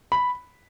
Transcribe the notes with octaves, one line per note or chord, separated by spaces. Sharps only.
B5